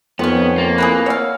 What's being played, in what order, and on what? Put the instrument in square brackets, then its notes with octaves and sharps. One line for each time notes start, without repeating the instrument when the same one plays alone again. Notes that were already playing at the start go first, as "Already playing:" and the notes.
[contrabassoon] F2 [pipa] D#3 C#4 [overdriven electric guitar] B3 [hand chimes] C#5 C6 C#6
[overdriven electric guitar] A#3 [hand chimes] A6
[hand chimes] E4 [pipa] G#4 A#4 B4
[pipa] C#5 F5 [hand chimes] D5 F#5 E6